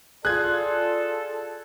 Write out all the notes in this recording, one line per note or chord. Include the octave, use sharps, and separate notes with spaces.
F4 G#4 A4 D5 F#6 G#6